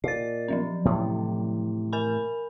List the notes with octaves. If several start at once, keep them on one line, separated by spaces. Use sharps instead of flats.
A#2 D#5 A6
F3 F#3 C#4
A2 C3 E3
A#4 G#5 B5